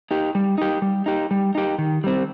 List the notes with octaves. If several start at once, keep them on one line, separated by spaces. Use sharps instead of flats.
D#4 G4
G3
D#4 G4
G3
D#4 G4
G3
D#4 G4
D#3
G3 C4